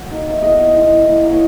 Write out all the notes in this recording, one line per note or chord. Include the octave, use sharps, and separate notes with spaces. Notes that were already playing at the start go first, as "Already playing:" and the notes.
Already playing: F#3 C#5
A#3 D#4
E5
G#3 B3 E4 D#5
G#3 B3 E4
A#3 E4
D#5
C#5